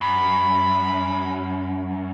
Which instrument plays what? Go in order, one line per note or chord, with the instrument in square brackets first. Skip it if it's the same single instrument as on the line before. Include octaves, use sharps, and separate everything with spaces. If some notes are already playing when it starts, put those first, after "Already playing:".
[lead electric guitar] F#2 [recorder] B5